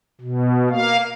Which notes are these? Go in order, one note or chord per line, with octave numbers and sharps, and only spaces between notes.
B2
A#3 F5